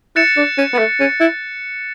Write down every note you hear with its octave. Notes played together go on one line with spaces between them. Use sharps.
E4 F#6 A6 C#7 E7
D4
C#4
B3
A3
C#4
E4